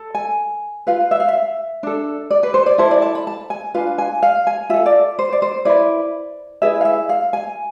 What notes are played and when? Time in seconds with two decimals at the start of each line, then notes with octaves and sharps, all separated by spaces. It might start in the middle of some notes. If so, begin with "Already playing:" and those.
Already playing: A4
0.15 G#5
0.87 F4 B4 F5
1.11 E5
1.20 F5
1.28 E5
1.83 D4 A4
2.31 D5
2.43 B4
2.54 C5
2.66 D5
2.78 E4 A4 C5
2.91 D5
3.02 A5
3.15 B5
3.27 A5
3.50 G#5
3.74 D4 F4 B4 F5
3.98 G#5
4.23 F5
4.47 G#5
4.70 F4 A4 E5
4.86 D5
5.19 C5
5.32 D5
5.42 C5
5.65 E4 B4 D5
6.62 E4 G#4 B4 E5
6.81 F5
6.85 E5
7.09 F5
7.33 G#5